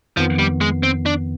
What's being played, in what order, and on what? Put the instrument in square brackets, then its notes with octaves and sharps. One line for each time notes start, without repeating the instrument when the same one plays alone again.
[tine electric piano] F2 D#3 B3 [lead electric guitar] F3
[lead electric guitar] G3
G#3
C4
D4